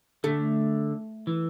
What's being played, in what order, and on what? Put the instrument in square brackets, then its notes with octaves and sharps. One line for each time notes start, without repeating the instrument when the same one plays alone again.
[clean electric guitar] D3 [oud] A3
[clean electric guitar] E3